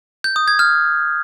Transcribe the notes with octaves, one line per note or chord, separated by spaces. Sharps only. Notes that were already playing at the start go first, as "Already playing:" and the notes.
G6
D#6
G#6
F6